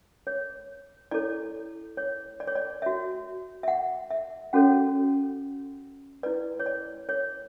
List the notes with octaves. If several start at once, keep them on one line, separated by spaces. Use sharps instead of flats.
C#5
E4 A4 C#5 D5
C#5
D5
C#5
D5
F#4 C#5 E5
E5
F#5
E5
C#4 F#4 A4 C#5 F#5
E4 B4 D5
C#5
D5
C#5